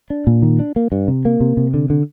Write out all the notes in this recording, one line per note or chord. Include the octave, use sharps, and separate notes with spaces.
D4
A#2
D#3
D4
A#3
G2
C3
A#3
C3
C3
D3
D3